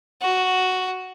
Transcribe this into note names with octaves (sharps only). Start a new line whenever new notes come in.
F#4